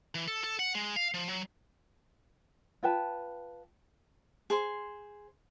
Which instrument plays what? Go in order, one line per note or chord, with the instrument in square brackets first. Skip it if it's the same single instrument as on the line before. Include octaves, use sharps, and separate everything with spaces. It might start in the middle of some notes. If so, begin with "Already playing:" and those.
[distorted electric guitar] E3
A4
A4
F#5
G#3
F5
F3
F#3
[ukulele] F4 B4 G5 A5
[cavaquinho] G#4 C5 C6